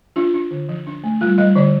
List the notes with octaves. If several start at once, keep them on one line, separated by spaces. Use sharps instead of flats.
D4 F4
D4
D3
F3
D4
A3
G3 F4
G3 D#5
D3 D5